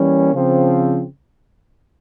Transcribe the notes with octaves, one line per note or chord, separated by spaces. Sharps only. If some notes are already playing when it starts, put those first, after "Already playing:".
Already playing: E3 G3 A#3 C#4
C#3 F3 C4